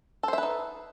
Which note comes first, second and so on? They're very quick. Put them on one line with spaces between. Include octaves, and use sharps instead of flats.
A4 C5 E5 B4 D#4